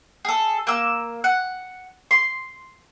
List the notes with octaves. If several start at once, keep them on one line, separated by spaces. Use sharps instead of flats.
G#4 A4
A#3 E6
F#5
C6